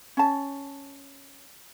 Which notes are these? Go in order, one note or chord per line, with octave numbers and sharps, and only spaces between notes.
C#4 A5